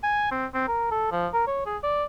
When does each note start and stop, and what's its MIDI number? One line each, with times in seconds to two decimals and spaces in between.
0.03 0.30 80
0.31 0.46 60
0.54 0.65 60
0.68 0.90 70
0.91 1.08 69
1.12 1.27 53
1.33 1.44 70
1.47 1.63 73
1.66 1.77 68
1.83 2.04 74